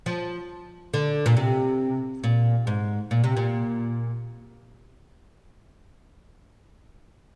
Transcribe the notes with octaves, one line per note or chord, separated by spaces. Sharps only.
F3
D3
A#2
C3
A#2
G#2
A#2
C3
A#2